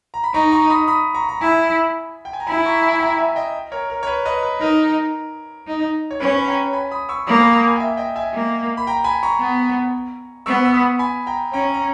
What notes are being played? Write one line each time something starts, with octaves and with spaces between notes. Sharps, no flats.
A#5
B5
D#4 A#5 C#6
A#5 C#6
B5 D#6
B5 D#6
A#5 C#6
A#5
E4 G#5 B5
G5
G#5
A#5
E4 G#5 B5
A#5 C#6
G#5 B5
G5 A#5
E5 G#5
D#5 G5
A#4 C#5
A#4
C#5
B4
B4 D#5
B4
D#4 A#4
D#4
C#5
C#4 B4
B5
G5 A#5
G#5 B5
B5 D#6
C#6 E6
A#3 B5 D#6
G#5 B5
B5 D#6
G#5 B5
G5
E5 G#5
D#5 G5
E5 G#5
A#3
B5
G5 A#5
G#5 B5
A#5 C#6
B3
B3 C#6 E6
E6
B5 D#6
G#5 B5
G5 A#5
C#4 G5 A#5
A#5